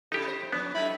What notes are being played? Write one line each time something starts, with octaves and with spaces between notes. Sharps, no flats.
C3 D#4 E4 G4 A4
C5
F3 B3 C#4
F#2 D#4 E4 A4 B5